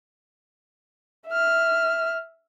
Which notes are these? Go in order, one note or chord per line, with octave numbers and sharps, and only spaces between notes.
E5 F6